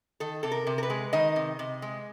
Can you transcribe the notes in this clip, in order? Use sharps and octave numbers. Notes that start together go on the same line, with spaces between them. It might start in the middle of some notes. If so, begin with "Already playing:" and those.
D#3 A4
C3 A4
A#4
C3
A#4
B4
G#3
D#3 D#5
C3
C3
G#3